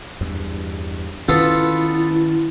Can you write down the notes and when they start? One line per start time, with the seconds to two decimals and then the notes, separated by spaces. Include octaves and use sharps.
0.21 E2 G2
1.28 D#3 B3 C#4 E4 F4 A4